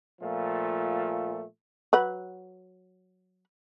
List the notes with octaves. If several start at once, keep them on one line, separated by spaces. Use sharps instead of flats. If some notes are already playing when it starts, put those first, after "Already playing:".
A#2 F3 A3
F#3 B4 F#5